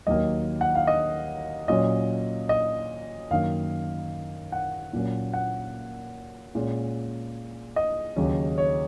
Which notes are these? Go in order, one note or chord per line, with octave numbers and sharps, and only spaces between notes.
D#2 D#3 F#3 A#3 D#5
F#5
F5
D#5
A#2 F#3 C#4 D#5
D#5
F#2 D#3 A#3 F5
F#5
A#2 F#3 A#3 C#4
F#5
A#2 G#3 C#4
D#5
D#2 C#3 F#3 C#4
C#5